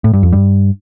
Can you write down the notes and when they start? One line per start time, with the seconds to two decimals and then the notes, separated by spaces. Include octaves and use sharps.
0.04 A2
0.13 G2
0.23 F2
0.32 G2